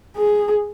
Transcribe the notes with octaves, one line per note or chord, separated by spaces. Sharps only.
G#4